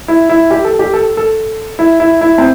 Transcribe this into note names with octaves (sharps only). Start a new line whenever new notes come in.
E4
E4
G4
A4
G4
A4
A4
E4
E4
E4
C4